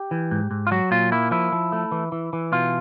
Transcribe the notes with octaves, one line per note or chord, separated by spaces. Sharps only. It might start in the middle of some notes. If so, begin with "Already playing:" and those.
Already playing: G4
E3
G#2
G#2
F4
F#3 F#4
A#2 F4
A#3 E4
F3 E4
F3
A3
E3
E3
E3
B2 F4